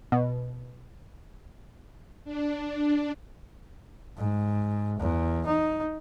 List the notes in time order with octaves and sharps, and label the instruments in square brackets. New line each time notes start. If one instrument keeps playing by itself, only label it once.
[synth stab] B2
[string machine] D4
[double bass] G#2
E2
D#4